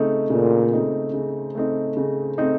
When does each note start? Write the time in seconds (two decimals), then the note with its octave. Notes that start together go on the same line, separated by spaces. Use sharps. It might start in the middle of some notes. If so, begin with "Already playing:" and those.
Already playing: C#3 A3 C4 D#4
0.30 A#2 C#3
0.72 A3 C4 D#4
1.14 C#3
1.55 A3 C4 D#4
1.97 C#3
2.38 A3 C4 D#4